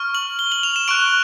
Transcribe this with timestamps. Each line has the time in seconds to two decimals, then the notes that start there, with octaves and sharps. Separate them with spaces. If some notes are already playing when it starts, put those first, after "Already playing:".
Already playing: C#6 F6
0.15 F#7
0.39 G7
0.52 F#7
0.63 F7
0.76 E7
0.88 C#6 F#6 D7